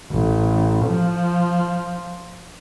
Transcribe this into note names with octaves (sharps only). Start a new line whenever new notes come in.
A1
F3